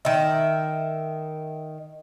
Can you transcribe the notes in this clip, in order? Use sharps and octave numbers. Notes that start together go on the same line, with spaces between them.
D#3 E5